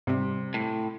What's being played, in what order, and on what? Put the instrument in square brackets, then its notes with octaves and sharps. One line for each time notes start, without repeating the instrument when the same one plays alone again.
[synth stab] G#2 G3 [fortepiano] C3
[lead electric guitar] A2